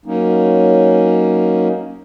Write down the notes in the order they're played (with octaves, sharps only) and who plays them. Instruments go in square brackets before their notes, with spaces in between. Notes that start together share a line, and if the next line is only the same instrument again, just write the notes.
[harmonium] F#3 A#3 C#4 D#4